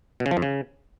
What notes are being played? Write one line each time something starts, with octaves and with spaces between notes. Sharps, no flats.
B2
C#3
F3
F2
C#3